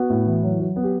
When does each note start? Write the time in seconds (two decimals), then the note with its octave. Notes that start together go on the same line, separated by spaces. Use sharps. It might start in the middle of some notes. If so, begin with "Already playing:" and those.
Already playing: B3 F#4
0.10 A2
0.26 E3
0.43 F#3
0.60 F#3
0.76 B3
0.83 G4